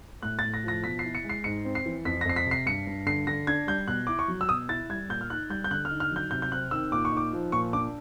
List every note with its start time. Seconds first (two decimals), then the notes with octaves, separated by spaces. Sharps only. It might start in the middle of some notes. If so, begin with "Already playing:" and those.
0.23 A2 F#6
0.39 A6
0.44 A2
0.54 A#6
0.64 F3 A#6
0.84 B2 B6
0.99 C7
1.05 E4
1.15 C#7
1.24 G#3
1.29 C7
1.44 G#2 C#7
1.65 C4
1.75 C7
1.86 E3
2.05 F2 B6
2.21 A#6
2.25 F2 C7
2.36 B6
2.46 C3
2.51 C7
2.66 G2 C#7
2.87 G2
3.06 D3 C7
3.27 D3 A#6
3.47 D4 G#6
3.67 G3 G6
3.87 B2 F#6
4.07 E4 D6
4.19 C#6
4.28 F#3
4.41 E6
4.49 B2 D#6
4.69 E4 A6
4.89 G3 G#6
5.09 A#2 G6
5.21 F6
5.30 D#4 F#6
5.50 G3 G6
5.64 G6
5.71 D3 F#6
5.85 F6
5.91 D#4
6.00 F6
6.11 F#3
6.16 G6
6.31 C3 G6
6.42 G6
6.52 C4 F#6
6.71 D#3 E6
6.92 A#2 D6
7.05 C#6
7.12 D#4 D6
7.33 F3
7.52 A#2 C#6
7.73 D4 D6